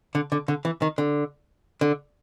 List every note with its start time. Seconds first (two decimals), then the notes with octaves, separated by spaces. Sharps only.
0.15 D3
0.32 D3
0.48 D3
0.65 E3
0.82 D#3
0.98 D3
1.81 D3